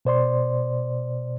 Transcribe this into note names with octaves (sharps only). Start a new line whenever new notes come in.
B2 C5 D5 C6